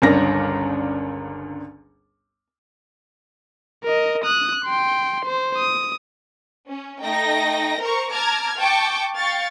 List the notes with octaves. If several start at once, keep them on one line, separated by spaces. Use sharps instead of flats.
G1 C#2 D4 A#4 A#6
A#4 D#5
D#6 F#6
G5 C6
C5
D#6
C#4
A3 D#4 G5 A#6
A#4 C5 A#5 C#6
A5 A#5 D6 F6 G#6
G5 A5 C#6 D6
F5 G5 C#6 A6